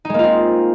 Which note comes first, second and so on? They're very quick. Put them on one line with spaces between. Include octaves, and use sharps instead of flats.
D#4 G#3 A#3 F4 C4